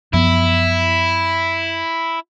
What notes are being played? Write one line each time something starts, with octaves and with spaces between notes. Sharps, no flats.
F#2 F3 B3 E4